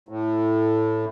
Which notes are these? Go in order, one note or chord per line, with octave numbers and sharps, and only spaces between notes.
A2